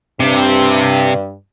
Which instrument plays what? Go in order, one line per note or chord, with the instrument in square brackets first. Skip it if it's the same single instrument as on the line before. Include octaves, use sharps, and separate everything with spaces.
[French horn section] G2 [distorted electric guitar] C3